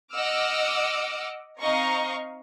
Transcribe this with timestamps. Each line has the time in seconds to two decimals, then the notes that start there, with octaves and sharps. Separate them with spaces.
0.13 D#5 F#5 D6 E6 F6
1.60 C4 D#4 D#5 F5 A#5 C#6